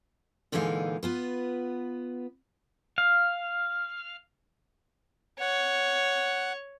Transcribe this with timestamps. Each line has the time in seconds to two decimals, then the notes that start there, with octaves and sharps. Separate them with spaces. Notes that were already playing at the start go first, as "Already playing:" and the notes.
0.52 A#2 D3 E3 G#3 D#4 F5
1.03 B3 F4 B4
2.98 F5
5.40 C#5 F#5